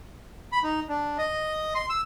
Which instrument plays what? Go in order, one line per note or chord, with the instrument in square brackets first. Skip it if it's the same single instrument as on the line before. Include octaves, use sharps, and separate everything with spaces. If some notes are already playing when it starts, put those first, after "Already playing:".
[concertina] B5
D#4
D4
D#5
C6
E6